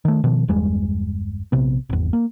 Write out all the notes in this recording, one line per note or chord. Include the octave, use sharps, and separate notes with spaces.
D#3 A3
B2 D#3 F3
G1 E2 G3 G#3
A#1 C3 B3
G#1 E2
A#3